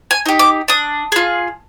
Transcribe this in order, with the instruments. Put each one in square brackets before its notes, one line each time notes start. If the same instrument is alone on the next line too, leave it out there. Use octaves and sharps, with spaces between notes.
[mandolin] G#5
D#4 G4
D6
D4 D#6
F4 G#4